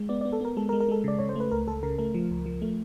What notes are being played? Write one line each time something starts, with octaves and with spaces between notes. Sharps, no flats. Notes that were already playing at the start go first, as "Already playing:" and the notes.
Already playing: G#3
B3 D5
D5
B3
A4
B3 A#4
G#3 A4
A#4
G#3
A#4
G#3 A4
C#3 D5
C#3 C#5
C5
A3 B4
C#2 A#4
C#2 A4
C#3 A#4
A3 A#4
F3
C#2
F3
A3